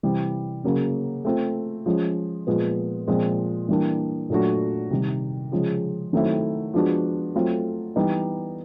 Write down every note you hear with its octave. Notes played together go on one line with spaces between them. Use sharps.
C3 E3 G3 C4
C#3 F#3 A#3 C#4
A3 C4 F4
F3 G#3 C#4
A#2 F3 G#3 B3
A#2 F3 G#3 C4
E3 G3 A#3 D4
A#2 F#3 A3 D4 F#4
C3 D#3 G3
C#3 F3 G#3
D#3 F#3 A3 C4 E4
F3 G#3 B3 D4 F#4
F#3 A3 C4 F4 A4
E3 G3 B3 D#4